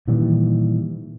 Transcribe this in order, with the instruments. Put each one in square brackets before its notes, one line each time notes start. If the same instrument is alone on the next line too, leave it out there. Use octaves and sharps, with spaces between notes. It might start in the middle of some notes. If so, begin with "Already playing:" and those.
[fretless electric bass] A#2 D#3 E3 G3